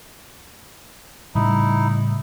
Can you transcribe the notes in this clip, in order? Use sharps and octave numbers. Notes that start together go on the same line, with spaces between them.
A2 C#3 G3 D#4 E4